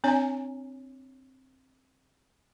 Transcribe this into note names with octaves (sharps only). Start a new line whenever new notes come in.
C4 D4 C#5 G#5